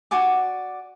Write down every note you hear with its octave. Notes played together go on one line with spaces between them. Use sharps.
F#4 D5 G#5 D6